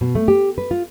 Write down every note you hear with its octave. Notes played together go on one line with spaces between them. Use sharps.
B2
A3
G4
B4
F4